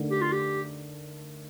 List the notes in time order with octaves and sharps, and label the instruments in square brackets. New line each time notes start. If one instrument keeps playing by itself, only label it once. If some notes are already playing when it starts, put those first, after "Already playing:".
Already playing: [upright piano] D3 A3 D#4 A#4
[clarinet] G4
F4
G4